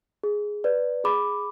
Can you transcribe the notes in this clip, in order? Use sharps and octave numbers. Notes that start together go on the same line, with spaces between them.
G#4
B4 D5
G#4 B5 D6